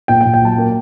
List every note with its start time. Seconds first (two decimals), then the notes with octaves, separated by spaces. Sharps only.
0.08 A#2 G5
0.21 G5
0.25 A#2
0.34 G5
0.42 F#3 A5
0.58 A#3